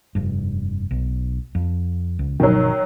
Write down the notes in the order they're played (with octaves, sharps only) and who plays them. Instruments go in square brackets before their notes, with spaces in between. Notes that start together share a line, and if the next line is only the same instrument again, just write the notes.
[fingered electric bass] F1 G2
B1
F2
C#2
[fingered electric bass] G1 B2 F3 [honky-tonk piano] D#3 F#3